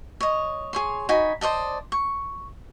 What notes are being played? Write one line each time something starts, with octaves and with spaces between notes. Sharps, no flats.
C#5 D#5
G#4 C#5 C6
D#4 F#4 G#5 B5
C5 D5 D#5 A5
C#6